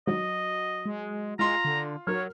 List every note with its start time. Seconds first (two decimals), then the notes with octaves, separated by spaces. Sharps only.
0.07 F#3 D#5
0.86 G#3
1.39 G#3 F4 A#5 C6
1.65 D3
2.07 F#3 F#4 A#4 C#5 F6